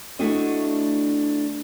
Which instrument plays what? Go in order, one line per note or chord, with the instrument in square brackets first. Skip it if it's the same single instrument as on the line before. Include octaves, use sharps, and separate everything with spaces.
[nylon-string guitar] A3 D4 E4 F#4 D#5